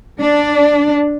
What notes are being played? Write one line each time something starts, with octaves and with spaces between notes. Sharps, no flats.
D4